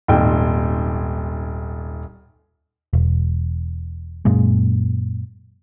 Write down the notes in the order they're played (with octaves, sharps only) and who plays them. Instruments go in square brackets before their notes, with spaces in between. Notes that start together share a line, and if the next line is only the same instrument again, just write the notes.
[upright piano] D#1 G#1 G5
[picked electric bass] E1
F#2 A#2 G#3